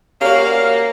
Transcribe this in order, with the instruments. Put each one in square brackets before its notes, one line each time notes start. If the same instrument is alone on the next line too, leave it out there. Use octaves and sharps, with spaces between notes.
[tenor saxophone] A#3 [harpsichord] C#4 F#4 [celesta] G4 C#5 D5 [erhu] F5